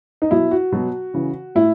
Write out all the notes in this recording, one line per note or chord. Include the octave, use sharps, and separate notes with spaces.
D#4
B2 F#3 E4
F#4
B2 F#3
C#3 E3
A2 E4